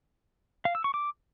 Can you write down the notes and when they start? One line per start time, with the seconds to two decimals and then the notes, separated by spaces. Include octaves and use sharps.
0.65 F5
0.75 E6
0.84 C#6
0.94 D6